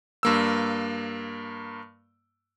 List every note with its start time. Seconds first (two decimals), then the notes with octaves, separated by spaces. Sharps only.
0.23 G2 A#3 E6